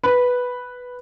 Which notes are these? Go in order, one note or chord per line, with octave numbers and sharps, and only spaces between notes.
B4